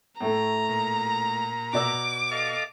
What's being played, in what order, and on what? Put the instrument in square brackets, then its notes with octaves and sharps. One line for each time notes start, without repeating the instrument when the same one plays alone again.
[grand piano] A2 A3 [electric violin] A#5
[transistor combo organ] A#2
[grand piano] B2 D5 E6 [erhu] D6
[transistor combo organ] A4 D#5 F5